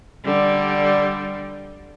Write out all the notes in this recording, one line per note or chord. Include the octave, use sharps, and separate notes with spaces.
D3 G3